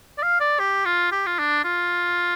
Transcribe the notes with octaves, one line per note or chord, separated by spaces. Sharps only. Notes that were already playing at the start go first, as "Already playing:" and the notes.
D5
F5
D5
G4
F4
G4
F4
D4
F4